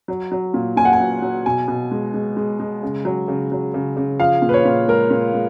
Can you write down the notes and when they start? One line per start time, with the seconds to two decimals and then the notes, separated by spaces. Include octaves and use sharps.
0.08 F#3
0.32 F#3
0.54 A#2
0.77 A#2 G#5
0.85 F#5
0.93 G#5
1.00 F#3
1.22 F#3
1.46 B2 G#5
1.68 B2
1.91 G#3
2.14 G#3
2.37 G#3
2.60 G#3
2.83 C#3
3.05 F#3
3.28 C#3
3.52 F#3
3.74 C#3
3.97 C#3
4.20 F3 F5
4.42 A#2
4.49 B4
4.54 C#5
4.65 A#2
4.88 G#3 A#4
5.11 A#2
5.34 G#3